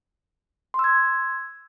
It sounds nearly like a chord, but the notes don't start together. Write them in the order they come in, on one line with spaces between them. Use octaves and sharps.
C6 E6 G#6